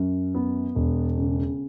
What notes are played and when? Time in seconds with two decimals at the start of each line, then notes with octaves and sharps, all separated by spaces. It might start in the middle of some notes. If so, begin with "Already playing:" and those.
Already playing: F#2
0.34 B3
0.75 E1
1.17 C#3